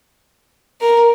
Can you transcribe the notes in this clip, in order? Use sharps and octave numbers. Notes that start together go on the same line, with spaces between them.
A#4